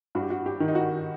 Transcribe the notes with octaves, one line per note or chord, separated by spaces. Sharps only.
G2 F#4
G4
F#4
G4
D#3
D#4
F#4